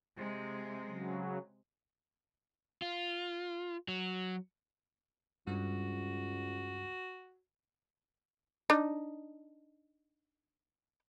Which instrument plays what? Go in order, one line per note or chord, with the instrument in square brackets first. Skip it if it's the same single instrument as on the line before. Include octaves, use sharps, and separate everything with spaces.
[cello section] C3 G#3
[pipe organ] C#3 F#3
[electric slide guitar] F4
F#3
[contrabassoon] C#2 [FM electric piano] G2 [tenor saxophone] F#4
[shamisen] D4 D#4